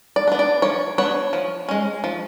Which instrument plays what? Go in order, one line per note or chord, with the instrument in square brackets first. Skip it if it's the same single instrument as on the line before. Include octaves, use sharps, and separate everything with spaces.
[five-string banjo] D5
B3 D4
D5
F3 C#5
B3 D4 C#5
F3
G#3 C#4
F3